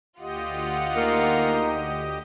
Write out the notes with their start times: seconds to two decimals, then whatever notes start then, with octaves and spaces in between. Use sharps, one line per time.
0.20 D2 F4 G4 D#5 F#5
0.96 A#3 D#4